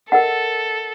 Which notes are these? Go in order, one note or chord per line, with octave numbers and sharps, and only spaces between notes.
A4 A#4 D#5 F#5